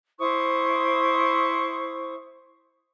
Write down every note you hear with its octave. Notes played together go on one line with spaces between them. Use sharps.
E4 C5 C#6 D#6